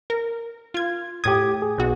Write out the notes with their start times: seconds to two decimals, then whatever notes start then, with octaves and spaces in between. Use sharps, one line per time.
0.10 A#4
0.74 F4 G#6
1.24 A2 G4 D#6 G#6
1.62 G#4
1.78 B1 F#4